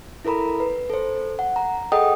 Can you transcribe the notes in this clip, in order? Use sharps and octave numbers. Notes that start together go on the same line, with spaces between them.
E4 A4 A#4 A#5 B5
B4
A4 C5
F#5
A#5
G#4 A4 D#5 F#5 G5 D#6